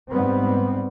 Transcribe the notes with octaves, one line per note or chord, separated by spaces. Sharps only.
G#2 G3 B3 C4